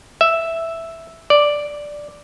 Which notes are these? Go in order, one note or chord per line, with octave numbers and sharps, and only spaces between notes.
E5
D5